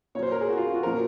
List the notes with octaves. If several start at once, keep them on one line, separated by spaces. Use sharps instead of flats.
A#2 F#3 C5 C#5
A#4
G#4
F#4
F4
F#4
A#2 F3 A#4